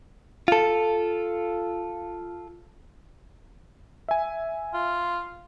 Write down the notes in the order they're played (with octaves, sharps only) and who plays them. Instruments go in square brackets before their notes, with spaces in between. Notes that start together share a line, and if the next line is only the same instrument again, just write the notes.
[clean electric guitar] F4 A4
[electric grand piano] E5 G#5
[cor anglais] F4